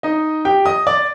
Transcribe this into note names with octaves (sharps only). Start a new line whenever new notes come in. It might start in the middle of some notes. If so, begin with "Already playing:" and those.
D#4 D#5
G4 G5
D#5 D#6
D5 D6